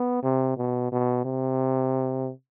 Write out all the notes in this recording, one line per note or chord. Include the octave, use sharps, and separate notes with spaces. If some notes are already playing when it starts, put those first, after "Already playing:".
Already playing: B3
C3
B2
B2
C3